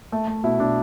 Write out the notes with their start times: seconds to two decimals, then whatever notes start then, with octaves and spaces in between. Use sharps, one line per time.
0.12 A3
0.27 A3
0.43 B2 E4
0.60 B2 D4